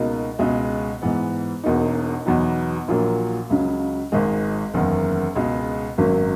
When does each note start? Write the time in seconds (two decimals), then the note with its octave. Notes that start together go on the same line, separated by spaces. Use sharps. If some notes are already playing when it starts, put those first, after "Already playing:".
Already playing: C#2 B2 A#3 D#4
0.39 C#2 B2 G#3
1.02 G#2 E3 B3
1.64 E1 E2 B2 A#3 D#4
2.26 E2 B2 F#3 B3 D#4
2.88 A#1 A#2 F#3 A#3
3.50 C#2 C#3 F#3
4.12 G#1 G#2 D#3 G#3
4.74 F#1 E2 D#3 A#3
5.35 C#2 B2 G#3
5.98 G#1 F#2 D#3 F#3 A#3